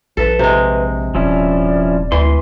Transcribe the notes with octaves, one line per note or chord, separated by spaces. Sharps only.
A#1 A4 B4 E5
C3 G#3
D#1 F3 C#4 E4 D5
D2 E3 C6